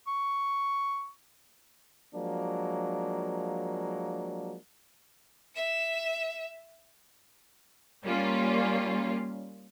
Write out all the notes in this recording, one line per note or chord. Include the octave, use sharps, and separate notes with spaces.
C#6
F3 F#3 G#3 A#3 D4
E5 E7
G3 A#3 C#4 F4